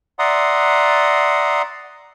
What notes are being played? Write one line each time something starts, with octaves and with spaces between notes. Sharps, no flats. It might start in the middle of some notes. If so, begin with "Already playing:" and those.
D5 E5 F#5 A#5 C6 D#6